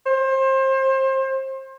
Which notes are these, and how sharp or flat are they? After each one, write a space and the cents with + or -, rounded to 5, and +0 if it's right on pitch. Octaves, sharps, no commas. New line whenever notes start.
C5 +30